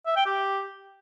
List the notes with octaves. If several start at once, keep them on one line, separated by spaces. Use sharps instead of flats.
E5
G5
G4